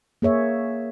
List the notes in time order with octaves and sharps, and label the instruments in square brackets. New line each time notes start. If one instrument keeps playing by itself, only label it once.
[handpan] A#3 G#4 C#5 E5